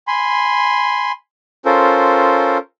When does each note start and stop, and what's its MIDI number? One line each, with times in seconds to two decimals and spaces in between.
0.07 1.12 80
0.07 1.12 83
0.07 1.12 84
1.65 2.58 61
1.65 2.58 65
1.65 2.58 69
1.65 2.58 70
1.65 2.58 72